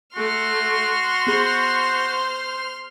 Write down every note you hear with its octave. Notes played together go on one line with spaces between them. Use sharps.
A3 F#4 C6 F6
B3 G#4 C5 B5